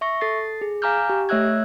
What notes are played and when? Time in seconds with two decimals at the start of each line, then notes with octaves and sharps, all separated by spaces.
0.01 E5 C#6 A#6
0.21 A4 A6 C7
0.61 G#4
0.82 F5 G#5 A#5 D6 F6 G6
1.10 G4
1.29 A3 C#5 E5 E6 F#6 G#6